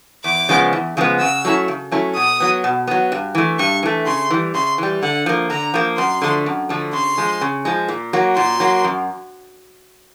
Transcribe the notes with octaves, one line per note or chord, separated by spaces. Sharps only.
E2 D6
C#3 F3 G#3 B3
E2
C#3 F3 G#3 B3
C#3 E6
F#3 A3 C#4 E4
C#3
F#3 A3 C#4 E4
B2 D#6
F#3 B3
B2
F#3 B3
G2
E3 A3
G2 C#6
E3 A3
C#3 C6
E3 G3
C#3 C6
E3 G3
D3 F#5
F3 A#3
D3 A#5
F3 A#3
F#2 C6
D3 F3 A3
F#2
D3 F3 A3
C#3 C6
F3 G#3
C#3
F3 G#3
A#2
F#3 A#3
A#2 C6
F#3 A#3
F#2